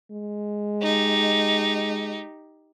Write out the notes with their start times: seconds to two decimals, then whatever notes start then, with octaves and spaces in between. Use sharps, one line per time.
0.11 G#3
0.81 D#4 G4